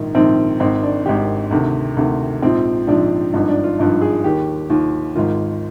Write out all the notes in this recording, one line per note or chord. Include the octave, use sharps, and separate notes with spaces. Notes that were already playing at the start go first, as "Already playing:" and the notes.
Already playing: A#1 G#2 D#3 D#4
A#1 G#2 D#3 C4
G#1 G#2 D#3 C4
D4
G#1 G#2 D#3 G4
D2 C3 D#3
D2 C3 D#3
A#1 G#2 F3 C4
A#1 G#2 F3 D4
G#1 G2 F3 D#4
D4
F4
G#1 G2 F3
G#4
D#2 D#3 G4
D#2 D#3 F4
G#1 G#2 D#3 F4